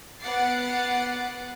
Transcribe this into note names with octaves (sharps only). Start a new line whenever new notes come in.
B3 F#5 D6 A6 C7